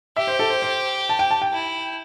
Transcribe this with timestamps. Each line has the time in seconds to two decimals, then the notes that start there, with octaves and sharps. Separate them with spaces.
0.16 G4 E5
0.27 C5
0.39 A4
0.50 C5
0.62 C5
1.09 A5
1.19 G5
1.31 A5
1.42 G5
1.53 E4